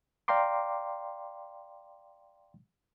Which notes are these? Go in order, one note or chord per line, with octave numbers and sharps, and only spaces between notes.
D5 F5 G5 A#5 C6 D6